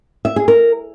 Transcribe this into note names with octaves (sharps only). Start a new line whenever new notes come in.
E5
G#4
A#4